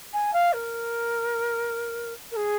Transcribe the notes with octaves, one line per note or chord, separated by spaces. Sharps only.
G#5
F5
A#4
A#4
G#4